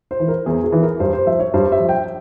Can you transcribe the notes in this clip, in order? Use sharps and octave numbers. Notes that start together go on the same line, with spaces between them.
C5
E3
A#4
E2 G#4
G#4
E3
A#4
G2 C5
C5
F3 E5
C#5
G2 C5
E5
F3
G5